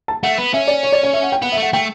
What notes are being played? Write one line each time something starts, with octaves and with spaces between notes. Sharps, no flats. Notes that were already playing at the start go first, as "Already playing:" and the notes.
A5
A3 F#5
B3
C#4 E5
D5
C#5
D5
C#5
E5
F#5
G5
B3 F#5
E5
A3
F#5
A3 G5